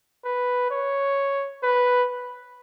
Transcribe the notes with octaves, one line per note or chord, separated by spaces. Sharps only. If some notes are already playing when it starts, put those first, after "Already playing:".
B4
C#5
B4